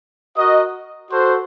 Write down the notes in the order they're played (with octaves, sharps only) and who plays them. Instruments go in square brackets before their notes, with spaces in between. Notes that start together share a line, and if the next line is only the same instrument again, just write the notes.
[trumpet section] F#4 A#4 D#5
F#4 A4 C5